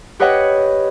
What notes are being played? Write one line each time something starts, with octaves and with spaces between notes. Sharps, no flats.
G4 B4 C#5 D#5 F#5 G5